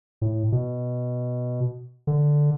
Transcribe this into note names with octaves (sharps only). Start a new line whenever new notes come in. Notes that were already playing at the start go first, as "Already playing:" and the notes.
A2
B2
D3